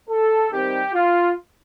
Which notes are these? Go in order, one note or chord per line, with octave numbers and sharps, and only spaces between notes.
A4
D#3 G3 C4 G4
F4